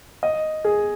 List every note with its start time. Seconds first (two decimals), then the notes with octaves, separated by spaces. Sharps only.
0.23 D#5
0.64 G#4